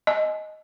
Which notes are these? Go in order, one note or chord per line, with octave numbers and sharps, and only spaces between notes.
D#5